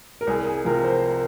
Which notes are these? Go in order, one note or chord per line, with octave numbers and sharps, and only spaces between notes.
A#4
C2 G#4
G#4
C3 F3 A#4
C5